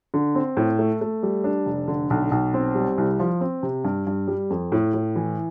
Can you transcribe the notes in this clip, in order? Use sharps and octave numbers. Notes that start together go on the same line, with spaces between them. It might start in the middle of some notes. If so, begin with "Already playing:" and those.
D3
C4
A2
A3
A3
G3
D4
F1
D3
B1
B1
C4
G3
C2
F3
C4
C3
G2
G2
G3
F2
A2
A2
E3